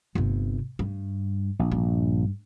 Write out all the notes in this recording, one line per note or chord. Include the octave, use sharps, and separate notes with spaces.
G1 C3
G2
A#1
G2